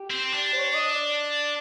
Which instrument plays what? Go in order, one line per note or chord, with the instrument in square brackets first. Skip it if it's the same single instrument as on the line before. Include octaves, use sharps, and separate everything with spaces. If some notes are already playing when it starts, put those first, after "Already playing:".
Already playing: [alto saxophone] G4
[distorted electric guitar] C4
D4
[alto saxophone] C5
C#5
D#5
D5